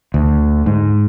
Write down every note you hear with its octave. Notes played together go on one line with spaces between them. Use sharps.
D2
G#2